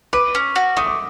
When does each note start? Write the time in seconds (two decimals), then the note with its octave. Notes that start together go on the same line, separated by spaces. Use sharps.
0.13 B4 D6
0.35 C#4
0.56 F#4
0.77 A3 D#6
0.86 D6